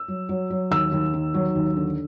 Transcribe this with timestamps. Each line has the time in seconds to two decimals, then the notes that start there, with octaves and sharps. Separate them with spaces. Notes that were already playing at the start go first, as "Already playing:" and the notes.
Already playing: E6
0.08 F#3
0.29 F#3
0.50 F#3
0.71 D#2 E6
0.92 D#2
1.14 D#3
1.34 F#3
1.55 D#2
1.76 D3